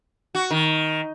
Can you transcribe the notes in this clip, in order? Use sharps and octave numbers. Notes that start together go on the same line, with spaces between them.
F#4
D#3